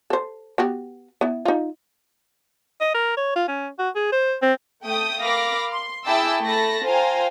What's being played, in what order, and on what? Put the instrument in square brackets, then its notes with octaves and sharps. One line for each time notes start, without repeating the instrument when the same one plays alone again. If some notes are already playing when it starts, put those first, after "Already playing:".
[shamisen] A4 C5
B3 F#4 G4
B3 E4
D#4 F4
[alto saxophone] D#5
A#4
C#5
F4
C#4
F#4
G#4
C5
C4
[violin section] A3 G5 D#6
A#4 F5 B5 D6 A#6
C6
E4 G#4 G5 A5 D6 E6
A3 A4 A5 B5 A#6
F4 C5 F5 G5 G#5 A#5